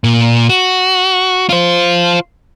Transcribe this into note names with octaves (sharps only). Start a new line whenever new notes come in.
A#2
F#4
F4 C5